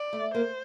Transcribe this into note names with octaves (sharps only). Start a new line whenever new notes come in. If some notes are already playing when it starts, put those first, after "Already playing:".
Already playing: D5
A3
A#3 C5